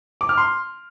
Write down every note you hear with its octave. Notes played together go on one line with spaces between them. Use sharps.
D6
F6
C6